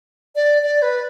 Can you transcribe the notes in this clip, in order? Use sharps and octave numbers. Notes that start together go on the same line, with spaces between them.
D5
D5
B4